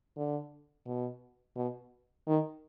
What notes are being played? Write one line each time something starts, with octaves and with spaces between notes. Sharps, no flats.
D3
B2
B2
D#3